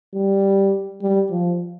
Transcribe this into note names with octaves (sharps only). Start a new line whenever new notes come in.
G3
G3
F3